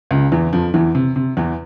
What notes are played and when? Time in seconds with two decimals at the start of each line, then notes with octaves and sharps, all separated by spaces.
0.11 C#2 C#3
0.32 E2 E3
0.53 F2 F3
0.74 E2 E3
0.95 C3
1.16 C3
1.37 E2 E3